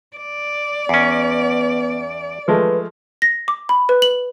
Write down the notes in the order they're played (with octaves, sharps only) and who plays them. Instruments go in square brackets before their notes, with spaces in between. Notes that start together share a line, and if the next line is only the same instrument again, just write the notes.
[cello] D5
[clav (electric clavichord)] E2 C#4 [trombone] B3
[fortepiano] F3 G#3 A3 [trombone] B4
[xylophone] A#6
D6
B5
B4
F#7